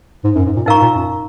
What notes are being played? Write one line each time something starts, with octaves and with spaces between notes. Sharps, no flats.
G#2
F#2
G#2
A#2
G#2 D#4 A#4 F5 A#5 C#6
A#2
F#2